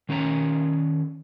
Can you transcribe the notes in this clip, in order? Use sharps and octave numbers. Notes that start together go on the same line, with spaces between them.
D#3 C#4 D4 C#5 A#5